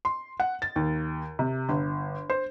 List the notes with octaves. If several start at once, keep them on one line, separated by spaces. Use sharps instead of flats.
C6
F#5
A6
D#2
C3
G1
C5